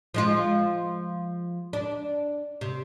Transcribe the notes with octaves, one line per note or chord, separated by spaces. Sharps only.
F3 G#3 F4
D4
C3